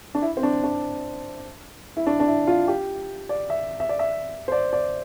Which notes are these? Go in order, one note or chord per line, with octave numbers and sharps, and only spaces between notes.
D4
E4
C4
D4
D4
E4
D4
D4
E4
F4
G4
D5
E5
E5
D5
E5
C5
D5
D5